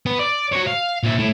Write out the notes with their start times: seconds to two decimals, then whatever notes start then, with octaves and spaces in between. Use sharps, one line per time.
0.06 B3
0.19 D5
0.52 F#4 C#5
0.67 F5
1.03 A#2 E5
1.19 A3 E4